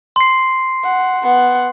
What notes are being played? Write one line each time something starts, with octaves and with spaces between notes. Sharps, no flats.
C6 C7
F#5
B3 F#5